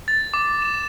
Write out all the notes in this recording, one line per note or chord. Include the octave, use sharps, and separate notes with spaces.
A6
D6
E7